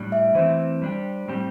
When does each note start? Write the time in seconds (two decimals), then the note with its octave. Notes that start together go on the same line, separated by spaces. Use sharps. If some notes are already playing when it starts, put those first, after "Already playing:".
Already playing: A2 G3 D4
0.12 E5
0.35 E3 A3 C4 C5
0.82 G3 D4 G4
1.28 A2 G3 C4 G4